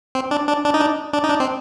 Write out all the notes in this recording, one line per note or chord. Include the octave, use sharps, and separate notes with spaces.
C4
D4
D4
D4
D#4
D4
D4
D#4
D4
C4